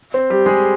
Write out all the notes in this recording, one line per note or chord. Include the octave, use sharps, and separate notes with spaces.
C4 C5
G3 G4
G#3 G#4